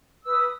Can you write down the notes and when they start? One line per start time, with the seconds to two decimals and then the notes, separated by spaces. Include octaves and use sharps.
0.23 E6
0.27 B4
0.30 D#6